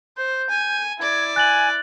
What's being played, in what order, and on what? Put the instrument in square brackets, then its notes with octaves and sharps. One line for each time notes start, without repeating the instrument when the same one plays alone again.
[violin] C5 [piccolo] G6
[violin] G#5
[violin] E4 D5 [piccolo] G#6
[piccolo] G#5 [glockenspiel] F#6 A6 F#7